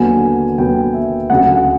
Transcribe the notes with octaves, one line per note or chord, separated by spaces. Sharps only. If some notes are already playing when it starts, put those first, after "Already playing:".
Already playing: D#2 D3 F#3 B3 G#5
D#2 D3 F#3 B3 G5
E5
D2 C#3 F#3 F#5
F#5